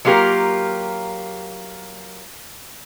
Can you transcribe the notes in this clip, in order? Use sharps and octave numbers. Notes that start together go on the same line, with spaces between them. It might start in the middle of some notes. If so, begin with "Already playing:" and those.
F#3 A#3 F4 G4 A#4